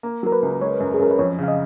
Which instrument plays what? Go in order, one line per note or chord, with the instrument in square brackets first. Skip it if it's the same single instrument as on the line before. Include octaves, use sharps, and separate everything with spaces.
[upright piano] A#3
[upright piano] F#3 [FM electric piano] A#4
[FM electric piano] B4
[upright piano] C#2
[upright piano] G#3 [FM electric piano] C#5
[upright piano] F#2
[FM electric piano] G#4
[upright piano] F#2 [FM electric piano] A#4
[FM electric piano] B4
[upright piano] F2 [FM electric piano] C#5
[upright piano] C#3 [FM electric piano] F5
[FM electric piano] D#5